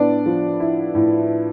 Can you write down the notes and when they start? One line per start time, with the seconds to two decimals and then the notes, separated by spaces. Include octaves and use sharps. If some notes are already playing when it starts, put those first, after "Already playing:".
Already playing: A2 B3 D4 D5
0.26 F3
0.60 E4
0.95 A2